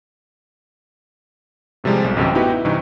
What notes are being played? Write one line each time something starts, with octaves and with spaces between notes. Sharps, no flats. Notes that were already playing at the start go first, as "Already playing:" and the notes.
A2 C3 F3 G3 G#3
B1
A1 F#2 C3 G4
B3 D#4 E4 F#4 G4 B4
E4
G2 C3 E3 D#4